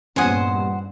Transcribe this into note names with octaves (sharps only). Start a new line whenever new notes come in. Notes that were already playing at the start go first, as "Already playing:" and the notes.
E2 G2 A#2 C#4 C5 F#5 G#5 D#6